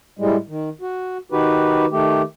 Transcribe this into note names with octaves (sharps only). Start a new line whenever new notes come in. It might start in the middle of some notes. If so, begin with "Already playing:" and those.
A2 G3 G#3
D#3
F#4
D#3 D#4 F#4 G4 B4
D#3 A3 G4